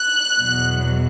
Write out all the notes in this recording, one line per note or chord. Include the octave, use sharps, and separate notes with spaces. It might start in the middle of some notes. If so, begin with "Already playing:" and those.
Already playing: F#6
E2 B2 F#3